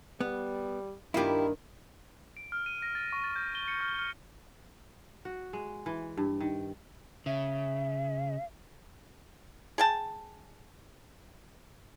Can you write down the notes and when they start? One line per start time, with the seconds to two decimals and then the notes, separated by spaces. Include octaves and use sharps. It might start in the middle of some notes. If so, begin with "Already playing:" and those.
0.21 G3 B3
1.14 G2 D#3 A#3 E4 F4 G4
2.37 D7
2.52 F6
2.66 D#7
2.82 A#6
2.95 A6
3.12 C#6
3.24 A6
3.36 G6
3.55 G7
3.68 C#7
3.80 F6
3.99 F6
5.25 F#4
5.53 G#3
5.86 E3
6.17 G2
6.41 D#3
7.26 C#3 E5
9.78 G#4 G5 A5